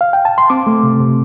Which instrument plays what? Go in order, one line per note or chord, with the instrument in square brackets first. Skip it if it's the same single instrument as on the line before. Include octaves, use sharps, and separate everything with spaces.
[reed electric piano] F5
G5
A5
C6
C4 D6
A3
C3
C3